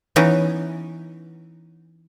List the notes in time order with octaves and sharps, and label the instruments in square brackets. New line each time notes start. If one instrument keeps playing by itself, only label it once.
[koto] E3 B3 C#4 D#4